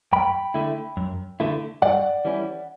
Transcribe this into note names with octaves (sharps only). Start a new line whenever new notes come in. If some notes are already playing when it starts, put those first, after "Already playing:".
F#2 G5 B5
D3 A3 E4
F#2
D3 A3 E4
G2 D5 F#5
E3 G3 C#4 E4